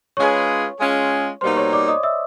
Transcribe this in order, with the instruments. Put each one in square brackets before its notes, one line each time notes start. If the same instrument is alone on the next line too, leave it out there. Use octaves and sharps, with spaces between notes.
[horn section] G#3 C#4 F4 G#4 B4 [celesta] C#5 C#6
[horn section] G#3 C#4 F4 G#4
[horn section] B2 G3 A#3 D#4 [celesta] C5 C6
[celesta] C#5 C#6
D5 D6
D#5 D#6
E5 E6